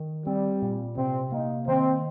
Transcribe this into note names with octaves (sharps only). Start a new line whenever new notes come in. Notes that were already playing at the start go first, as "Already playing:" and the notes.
Already playing: D#3
G3 C4
A#2
C3 C4
A#3 D#4
D#3 C4